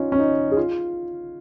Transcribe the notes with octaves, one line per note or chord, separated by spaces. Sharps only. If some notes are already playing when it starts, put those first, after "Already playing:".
Already playing: C#4 D#4 F4
C#4
D#4
G#4
F4